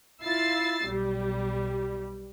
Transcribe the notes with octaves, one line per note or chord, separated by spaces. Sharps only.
E4 F4 E6 A6 C7
B1 G3